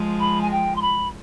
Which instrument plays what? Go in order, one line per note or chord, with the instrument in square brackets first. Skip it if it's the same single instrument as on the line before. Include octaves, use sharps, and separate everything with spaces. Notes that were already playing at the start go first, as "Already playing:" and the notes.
Already playing: [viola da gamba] F3 G#3
[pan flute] B5
G#5
G5
C6
B5